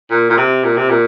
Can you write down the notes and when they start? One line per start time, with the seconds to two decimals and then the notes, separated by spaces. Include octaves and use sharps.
0.11 A#2
0.30 A#2
0.37 C3
0.63 A#2
0.77 C3
0.89 A#2